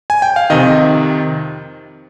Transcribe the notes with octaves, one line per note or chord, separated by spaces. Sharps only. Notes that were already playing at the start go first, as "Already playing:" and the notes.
G#5
G5
F5
F2 C3 D#3 D#5